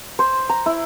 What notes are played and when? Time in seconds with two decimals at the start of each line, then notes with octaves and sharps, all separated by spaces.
0.19 C5
0.49 A#5
0.66 E4